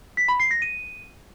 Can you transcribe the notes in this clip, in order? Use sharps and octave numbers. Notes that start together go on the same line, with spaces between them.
B6
B5
C7
A#6
D#7